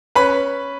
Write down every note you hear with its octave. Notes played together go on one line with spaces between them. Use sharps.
C#4 B4 B5